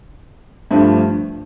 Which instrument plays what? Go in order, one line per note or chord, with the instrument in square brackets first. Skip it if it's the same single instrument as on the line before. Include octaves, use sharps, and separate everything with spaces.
[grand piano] G2 F3 A3 D4